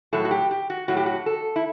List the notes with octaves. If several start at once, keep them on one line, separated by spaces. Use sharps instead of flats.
A2 F#3 A4
F#4
G4
G4
F#4
A2 F#3 F#4
G4
F#4
A4
E4